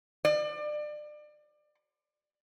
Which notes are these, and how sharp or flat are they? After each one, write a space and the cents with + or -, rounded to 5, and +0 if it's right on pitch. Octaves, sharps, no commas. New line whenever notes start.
D5 +30